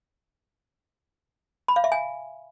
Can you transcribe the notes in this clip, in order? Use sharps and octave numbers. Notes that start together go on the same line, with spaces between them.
B5
F5
E5
G#5